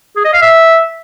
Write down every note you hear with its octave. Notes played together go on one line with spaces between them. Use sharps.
G#4
D#5
F5
E5